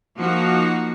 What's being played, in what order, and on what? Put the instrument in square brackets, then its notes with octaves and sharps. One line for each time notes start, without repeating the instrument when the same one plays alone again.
[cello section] F3 A#3 D#4 F#4